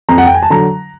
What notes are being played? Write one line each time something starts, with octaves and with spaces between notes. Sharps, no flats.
F2 A#5
F#5
G5
G#5
A5
D3 F#3 A#5